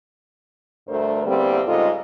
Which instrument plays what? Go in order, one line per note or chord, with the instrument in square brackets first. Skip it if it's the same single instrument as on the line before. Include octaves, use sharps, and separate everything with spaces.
[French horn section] D2 G2 A3 A#4 C5
E2 D3 E3 G3 A#3 C4
G#2 C#3 G3 F4 A4 D#5